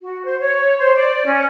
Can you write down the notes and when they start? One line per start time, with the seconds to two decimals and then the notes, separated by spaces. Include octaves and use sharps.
0.01 F#4
0.25 C5
0.40 C#5
0.78 C5
0.96 D5
1.26 C#4